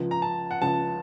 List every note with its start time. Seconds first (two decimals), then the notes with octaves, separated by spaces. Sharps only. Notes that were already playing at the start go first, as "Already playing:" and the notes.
Already playing: C#2 C#3 F3
0.11 A#5
0.22 A5
0.51 F#5
0.61 C#2 C#3 F3 A5